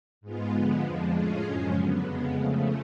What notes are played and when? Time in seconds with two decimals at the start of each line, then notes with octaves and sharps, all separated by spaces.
0.21 G#2 G#3 B3 F4
0.52 D3 F3 G#3 B3
0.82 F2 F3 G#3 D4
1.12 A2 G#3 C#4 F4 G#4
1.42 F#2 C#3 F3 G#3 C#4
1.73 D3 F#3 B3
2.03 F2 C#3 G#3 B3
2.34 C#3 F3 A3